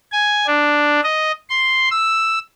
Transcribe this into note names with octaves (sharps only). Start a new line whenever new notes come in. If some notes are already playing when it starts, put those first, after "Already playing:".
G#5
D4
D#5
C6
E6